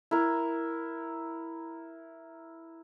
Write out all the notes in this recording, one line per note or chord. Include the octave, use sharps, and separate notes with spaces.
E4 A#4